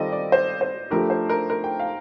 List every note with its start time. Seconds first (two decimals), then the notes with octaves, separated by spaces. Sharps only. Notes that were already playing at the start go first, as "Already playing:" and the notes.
Already playing: D#3 G3 C4 F4 A4 D5 D#5
0.12 D5
0.32 C5
0.61 C5
0.91 F3 A3 D4 G4 A#4
1.10 C5
1.29 A#4
1.50 A#4
1.64 G5
1.80 F5